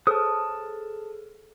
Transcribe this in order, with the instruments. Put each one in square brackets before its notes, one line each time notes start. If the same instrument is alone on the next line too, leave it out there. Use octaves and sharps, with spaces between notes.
[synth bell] G#4 A4 [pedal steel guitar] A5 D#6